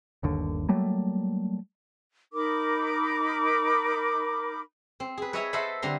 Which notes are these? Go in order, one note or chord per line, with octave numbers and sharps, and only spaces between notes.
G1 D#2 D3
F#3 G3 A3 A#3
D#4 A#4 B5 D6
C4
G#4 B4
B4 C#5 D#5 E5 G#5 A#5
A4 C5 D#5 E5 F#5 B5
D3 G3 C4 A#5 C6